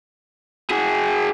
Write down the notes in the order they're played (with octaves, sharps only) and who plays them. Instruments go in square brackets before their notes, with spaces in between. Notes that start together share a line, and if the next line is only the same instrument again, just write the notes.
[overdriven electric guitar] F#4 G#4